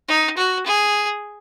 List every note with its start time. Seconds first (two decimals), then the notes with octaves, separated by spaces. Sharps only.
0.08 D#4
0.37 F#4
0.66 G#4